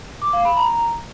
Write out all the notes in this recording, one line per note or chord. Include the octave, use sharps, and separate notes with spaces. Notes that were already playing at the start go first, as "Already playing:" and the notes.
D6
F5
B5
A#5